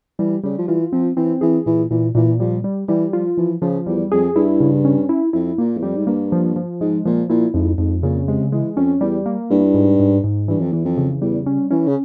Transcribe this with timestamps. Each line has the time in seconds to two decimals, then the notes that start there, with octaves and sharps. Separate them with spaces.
0.19 E3 G3
0.44 C#3 G3
0.58 F3
0.67 E3 F4
0.92 F3 C4
1.16 E3 C4
1.41 E3 G#4
1.66 A#2 E3
1.91 A#2 E3
2.15 A#2 E3
2.40 F3 G3
2.64 G3
2.88 E3 G3
3.13 F3 F4
3.37 E3 F3
3.62 C#3 F3
3.87 E2 G3
4.12 F2 G#4
4.36 G2 E4
4.60 C#3
4.85 C#4
5.09 E4
5.33 F2 E4
5.58 A#2 A#3
5.77 E2
5.82 F2 G3
5.96 G#2
6.07 G2 A#3
6.32 F3
6.56 F3
6.81 G#2 G#3
7.06 A#2 F3
7.29 A#2 E4
7.54 F2 G#2
7.78 F2 G#2
8.03 A#2 C#3
8.28 C3 G#3
8.52 E3 G#3
8.76 F2 C#4
9.01 E2 G3
9.26 A#3
9.50 G2 E4
9.74 G#2
10.00 G#2
10.24 G#2
10.48 G2 E3
10.60 F2
10.72 E2 E3
10.85 F2
10.98 C#3
11.22 E2 G3
11.46 C#4
11.71 E3 C#4
11.87 C#3